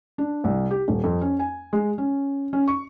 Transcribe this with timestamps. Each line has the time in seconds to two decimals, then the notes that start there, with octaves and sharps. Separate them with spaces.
0.18 D4
0.44 C2
0.71 G4
0.88 D#1
1.04 F2
1.21 C#4
1.39 G#5
1.73 G#3
1.98 C#4
2.53 C#4
2.68 C#6